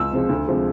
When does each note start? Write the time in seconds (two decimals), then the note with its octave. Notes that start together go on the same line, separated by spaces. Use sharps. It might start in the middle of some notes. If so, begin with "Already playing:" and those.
Already playing: C#2 E6
0.12 C3 F3 G#3
0.29 D2
0.48 C3 F3 G#3